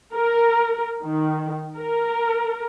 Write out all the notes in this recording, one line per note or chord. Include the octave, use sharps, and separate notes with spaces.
A#4
D#3
A#4